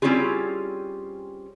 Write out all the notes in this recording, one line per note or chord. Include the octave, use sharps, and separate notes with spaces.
G3 C4 C#4 E4 F4 G#4